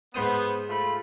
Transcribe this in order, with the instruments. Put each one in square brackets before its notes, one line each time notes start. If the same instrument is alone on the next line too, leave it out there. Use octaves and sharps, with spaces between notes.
[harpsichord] G#2 C5 D#6 [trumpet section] B3
[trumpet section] A3 F4 B5